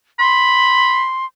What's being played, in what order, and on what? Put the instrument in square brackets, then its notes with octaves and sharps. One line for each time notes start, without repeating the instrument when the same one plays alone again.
[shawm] B5 [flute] C6